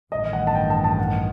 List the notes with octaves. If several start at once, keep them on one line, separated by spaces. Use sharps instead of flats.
A1 G2 D#3 D#5
F#5
A5
G5
A5
A5
F#5